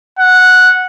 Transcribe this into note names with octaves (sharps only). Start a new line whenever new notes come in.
F#5